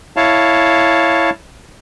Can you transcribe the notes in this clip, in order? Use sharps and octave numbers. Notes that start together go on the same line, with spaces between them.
E4 C#5 F5 A5